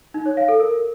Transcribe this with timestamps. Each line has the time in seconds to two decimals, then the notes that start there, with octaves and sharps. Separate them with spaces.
0.14 D#4
0.26 C#5
0.37 F5
0.48 A4
0.60 A#4